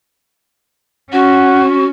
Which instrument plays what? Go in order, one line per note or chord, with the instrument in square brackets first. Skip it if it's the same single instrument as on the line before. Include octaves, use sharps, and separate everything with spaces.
[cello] C#4 [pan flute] F#4 [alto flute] F#5